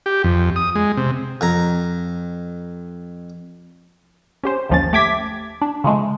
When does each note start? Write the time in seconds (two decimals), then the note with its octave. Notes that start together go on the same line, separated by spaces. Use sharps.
0.06 G4
0.24 F2
0.56 D#6
0.75 G#3
0.97 C3
1.41 F2 A#5
4.43 C#4 G4 C5
4.69 G1 D#2 F3 C#4 A6
4.93 A3 G4 D6 G#6 B6
5.61 D4
5.84 C#3 F3 G#3 A3